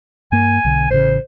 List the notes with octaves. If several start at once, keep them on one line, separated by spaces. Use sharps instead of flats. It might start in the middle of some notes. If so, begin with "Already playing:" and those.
G2 A#3 G#5
B1 D3
A1 C#3 C5